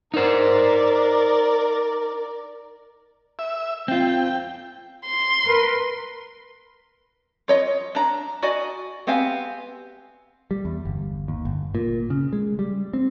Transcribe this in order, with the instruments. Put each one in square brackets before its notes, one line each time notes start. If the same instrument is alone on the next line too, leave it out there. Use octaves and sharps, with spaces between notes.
[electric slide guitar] D#4 C5 [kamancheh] A#4 D5
[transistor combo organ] E5
[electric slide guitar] C4 F4 [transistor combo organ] G5
[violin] C6
[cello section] A#4 B4
[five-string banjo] F4 C#5 D#5
D4 A#5
F#4 D5 D#5 G#5
B3 C4 G4 F5 G#5
[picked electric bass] G3
E2
G1
D#2
G1
A#2
C#3
G#3
G3
C4